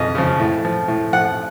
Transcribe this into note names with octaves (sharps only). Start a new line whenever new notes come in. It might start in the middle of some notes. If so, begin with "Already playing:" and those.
Already playing: F2 C#3 F3 D#5
C#3 F3
A2
F3
A2
F3 F#5